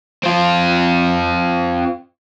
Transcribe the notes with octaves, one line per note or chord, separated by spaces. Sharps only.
C4 F4